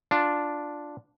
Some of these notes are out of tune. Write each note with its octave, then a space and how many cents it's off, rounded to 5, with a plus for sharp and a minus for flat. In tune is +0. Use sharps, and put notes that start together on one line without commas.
D4 +0 F4 +5